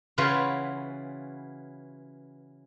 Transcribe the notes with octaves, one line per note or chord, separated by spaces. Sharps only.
C#3 E3 F4 F#4 B4